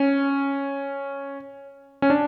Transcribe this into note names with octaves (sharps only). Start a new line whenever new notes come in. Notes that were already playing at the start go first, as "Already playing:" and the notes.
Already playing: C#4
C#4
D4